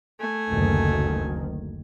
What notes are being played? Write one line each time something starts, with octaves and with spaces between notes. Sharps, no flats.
A3 G#5
F#1 D2 D#3